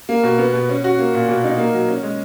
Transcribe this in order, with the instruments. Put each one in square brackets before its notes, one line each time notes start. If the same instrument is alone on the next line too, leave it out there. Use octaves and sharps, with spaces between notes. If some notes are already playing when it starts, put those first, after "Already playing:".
[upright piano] A#3
B2
B3
B2
C#4
F#4
A#3
A#2
B2
D#4
A#3
F#3
C#4
G#3